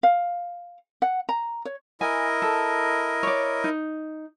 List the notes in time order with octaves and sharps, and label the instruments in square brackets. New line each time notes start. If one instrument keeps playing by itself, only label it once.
[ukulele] F5
F#5
A#5
C#5
[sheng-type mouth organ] E4 A#4 D#5 [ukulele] G#5
[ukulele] A4
C#5 D5
D#4